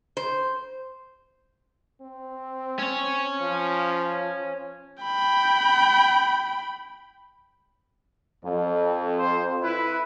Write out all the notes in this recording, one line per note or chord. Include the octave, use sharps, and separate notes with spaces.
C5
C4
C#4 C#5
F3
G5 B5
F2
C5
E4 B4